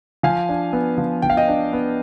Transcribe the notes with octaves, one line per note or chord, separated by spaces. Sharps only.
F3 F5 G#5
D4
B3
F3
F3 G5
F5
D#5 G5
D4
B3